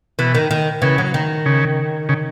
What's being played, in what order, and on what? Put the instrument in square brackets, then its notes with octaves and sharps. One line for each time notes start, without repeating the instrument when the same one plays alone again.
[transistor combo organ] B2 [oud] E3
[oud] D#3
D#3
[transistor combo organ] C#3 [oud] E3
[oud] F#3
D#3
[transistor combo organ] C#3
C#3